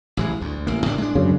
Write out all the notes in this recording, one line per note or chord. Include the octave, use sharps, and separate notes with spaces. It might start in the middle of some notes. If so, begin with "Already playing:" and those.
A1 E3 G#3
D2
A1 A#3
A2 A3 D4
G#3 D4
F#2 C#3